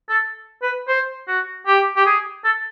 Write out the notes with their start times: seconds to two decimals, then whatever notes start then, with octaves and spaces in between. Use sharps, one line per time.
0.09 A4
0.63 B4
0.88 C5
1.28 F#4
1.67 G4
1.97 G4
2.06 G#4
2.45 A4